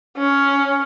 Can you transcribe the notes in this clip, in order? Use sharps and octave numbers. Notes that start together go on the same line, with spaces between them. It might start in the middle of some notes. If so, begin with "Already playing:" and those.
C#4